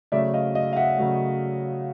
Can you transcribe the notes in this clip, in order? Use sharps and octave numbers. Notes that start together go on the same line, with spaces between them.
C#3 F#3 A3 D5 E5
D#5 F5
D#5 F5
F5
E5 F#5
C#3 F#3 A3